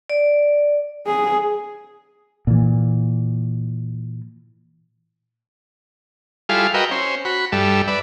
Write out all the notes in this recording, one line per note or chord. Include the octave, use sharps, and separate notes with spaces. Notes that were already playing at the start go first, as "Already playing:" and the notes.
D5
G#4
A#2 E3
G3 E4 F4 G#4 A4 F5
F#4 A#4 B4 D#5 E5 G5
C#4 C5
F#4 B5
G2 G3 A4 E5
B4 D5 E5